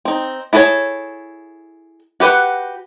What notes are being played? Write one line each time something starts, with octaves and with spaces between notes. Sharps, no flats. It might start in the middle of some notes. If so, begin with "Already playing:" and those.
C4 D#4
E4 G#4 A4 B4 C#5
F#4 G4 B4 F#5